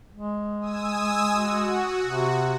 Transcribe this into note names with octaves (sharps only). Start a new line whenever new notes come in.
G#3
G#5 D#6 E6
F#4
C3